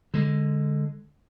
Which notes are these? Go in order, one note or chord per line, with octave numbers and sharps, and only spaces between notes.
D3 G#3